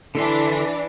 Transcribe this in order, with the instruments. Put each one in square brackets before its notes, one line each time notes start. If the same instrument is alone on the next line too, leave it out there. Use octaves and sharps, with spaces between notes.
[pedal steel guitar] D3 A4 C6 [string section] E3 D4